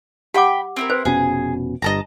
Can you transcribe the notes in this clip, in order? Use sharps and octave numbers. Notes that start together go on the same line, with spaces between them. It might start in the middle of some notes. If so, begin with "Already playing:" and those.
G4 F#5 G5 B5 D6
C4 E4 A#4
B4 C5
F1 B2 C#4 G#4
G1 G2 D#5 A5 A#5